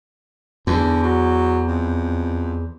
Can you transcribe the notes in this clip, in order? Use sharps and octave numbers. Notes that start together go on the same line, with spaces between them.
E2 D3
F#3
F2